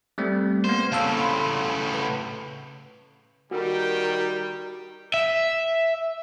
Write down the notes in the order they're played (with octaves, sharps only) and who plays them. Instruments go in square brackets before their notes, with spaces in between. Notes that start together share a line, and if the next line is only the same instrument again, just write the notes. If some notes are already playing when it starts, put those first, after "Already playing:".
[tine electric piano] G3 A3 C4
[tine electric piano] A#3 B3 [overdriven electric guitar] C5
[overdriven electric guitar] A2 C#3 [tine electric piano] F5 A5 E6
[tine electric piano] B5 C6
B4
[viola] D#3 [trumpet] G3 [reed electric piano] F#4 [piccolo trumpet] G5
[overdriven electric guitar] E5